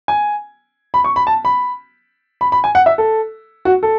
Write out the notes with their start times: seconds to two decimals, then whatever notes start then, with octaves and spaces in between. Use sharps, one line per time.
0.08 G#5
0.94 B5
1.04 C#6
1.16 B5
1.27 A5
1.45 B5
2.41 B5
2.52 B5
2.64 G#5
2.75 F#5
2.86 E5
2.98 A4
3.65 F#4
3.83 A4